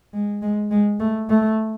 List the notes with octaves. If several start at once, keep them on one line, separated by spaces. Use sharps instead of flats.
G#3
G#3
G#3
A3
A3